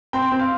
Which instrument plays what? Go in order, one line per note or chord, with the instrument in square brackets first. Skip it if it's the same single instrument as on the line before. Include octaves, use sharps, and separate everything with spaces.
[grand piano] C4 G5
C4
F5